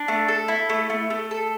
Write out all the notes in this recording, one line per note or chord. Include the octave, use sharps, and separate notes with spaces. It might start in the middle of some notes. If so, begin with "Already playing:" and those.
Already playing: D4
A3
A4
E4
A3
A3
A3
A4